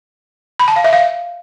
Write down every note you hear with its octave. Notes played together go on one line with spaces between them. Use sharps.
B5
A5
F5
E5
F5